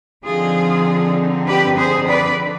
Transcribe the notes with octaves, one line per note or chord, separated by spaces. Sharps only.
D3 F3 C4 D#4 F4 G#4
G4 B4
G#4 C5
B4 D5